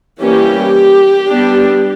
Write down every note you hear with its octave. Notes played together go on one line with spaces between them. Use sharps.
E3 G3 A#3 C#4 G4
G3 B3 D4